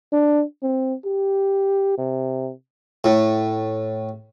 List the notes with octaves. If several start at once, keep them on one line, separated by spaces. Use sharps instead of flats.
D4
C4
G4
C3
A2